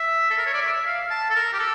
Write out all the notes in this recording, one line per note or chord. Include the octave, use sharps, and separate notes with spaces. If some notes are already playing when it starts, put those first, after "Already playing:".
Already playing: E5
A4
A#4
C#5
D5
E5
F5
A5
A4
A#4
G4
A4